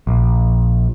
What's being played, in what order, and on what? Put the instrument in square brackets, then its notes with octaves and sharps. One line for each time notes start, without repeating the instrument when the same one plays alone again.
[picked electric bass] A#1